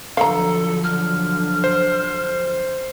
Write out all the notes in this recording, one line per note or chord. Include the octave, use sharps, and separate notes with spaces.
D3 F3 F#3 A4 F5 A#5
F6
C5